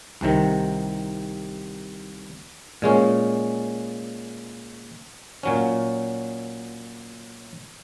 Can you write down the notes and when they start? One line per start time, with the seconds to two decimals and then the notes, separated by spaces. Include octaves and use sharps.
0.21 C2 C3 D#3
2.82 A#2 G#3 C#4
5.43 A#2 F#3 C#4